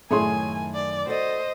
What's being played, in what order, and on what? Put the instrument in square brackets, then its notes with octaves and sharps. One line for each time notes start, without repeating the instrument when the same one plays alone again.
[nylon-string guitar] F#2 D#3 C#5 [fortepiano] A2 G#4 C6 [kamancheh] G#5
[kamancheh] D5
[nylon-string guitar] F#4 A4 D5 [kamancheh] C5 D#5